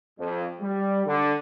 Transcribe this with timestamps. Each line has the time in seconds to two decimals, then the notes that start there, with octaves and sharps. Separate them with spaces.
0.19 F2
0.61 G3
1.06 D3